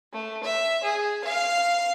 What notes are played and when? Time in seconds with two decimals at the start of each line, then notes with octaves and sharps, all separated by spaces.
0.13 A3
0.43 E5
0.83 G#4
1.24 F5